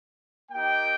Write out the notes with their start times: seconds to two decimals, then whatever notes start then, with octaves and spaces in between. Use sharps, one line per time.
0.51 A#3 D#4 G4 G5